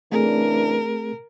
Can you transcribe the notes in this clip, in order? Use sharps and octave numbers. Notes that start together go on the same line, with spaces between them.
C#3 E3 A3 C4 D4 G#4 A#4